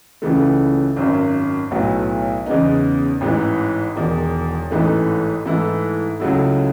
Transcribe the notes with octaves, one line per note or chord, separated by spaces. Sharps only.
C#2 C#3 E3 A3
G#1 F#2 D#3
B1 A2 F#3 B3
E2 C#3 G#3 B3 D#4
A1 G#2 E3
E1 E2 D#3
A1 G#2 E3 A3 D#4
G#2 E3 A3 E4
C#2 C#3 F#3 A3 E4